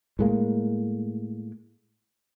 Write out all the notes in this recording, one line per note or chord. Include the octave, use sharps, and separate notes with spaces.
A2 G#3 A#3